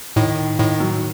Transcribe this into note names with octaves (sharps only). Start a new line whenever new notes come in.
A2 D#3
A2 D#3
F#3